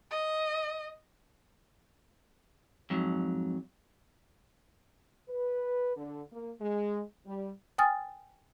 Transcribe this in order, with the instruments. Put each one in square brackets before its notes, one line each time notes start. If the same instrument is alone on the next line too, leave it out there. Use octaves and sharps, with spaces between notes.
[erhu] D#5
[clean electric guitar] F2 G#2 F#3
[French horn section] B4
D3
A#3
G#3
G3
[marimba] G5 G#5 D#6 F6 A6